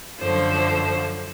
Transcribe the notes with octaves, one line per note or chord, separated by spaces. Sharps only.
F#2 D3 F3 C5